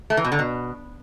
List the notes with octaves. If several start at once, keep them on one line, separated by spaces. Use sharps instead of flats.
A3
E3
B2
D3
B2